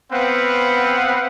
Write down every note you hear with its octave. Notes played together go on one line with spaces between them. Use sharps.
B3 C4 B4 F5 F#5